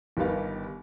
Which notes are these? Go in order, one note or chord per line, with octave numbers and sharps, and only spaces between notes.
G1 D#3 G3 B3 F5